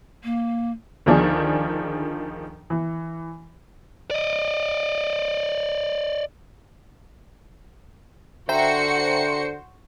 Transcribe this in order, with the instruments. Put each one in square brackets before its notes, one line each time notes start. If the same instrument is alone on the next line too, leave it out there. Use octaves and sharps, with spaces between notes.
[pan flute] A#3
[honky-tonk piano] D2 D#3 F3 D4 G#4
E3
[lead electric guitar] D5 D#5
[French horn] D3 [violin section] F#4 C#7 [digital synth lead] C5 [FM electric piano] E5 G5 A#5